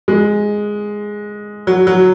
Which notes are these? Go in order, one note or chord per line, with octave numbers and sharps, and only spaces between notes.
G#3
F#3
F#3